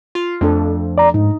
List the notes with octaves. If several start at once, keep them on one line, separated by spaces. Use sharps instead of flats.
F4
F2 A3 D4 A4
D5 A#5
G#2 D#4